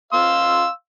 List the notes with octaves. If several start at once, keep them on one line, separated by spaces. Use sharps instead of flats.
F5 C6 E6